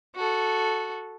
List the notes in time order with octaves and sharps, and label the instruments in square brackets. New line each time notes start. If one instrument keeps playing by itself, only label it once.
[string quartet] F#4 A4